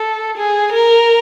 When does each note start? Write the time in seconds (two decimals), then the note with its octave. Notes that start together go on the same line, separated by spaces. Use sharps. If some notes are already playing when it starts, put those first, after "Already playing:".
Already playing: A4
0.37 G#4
0.72 A#4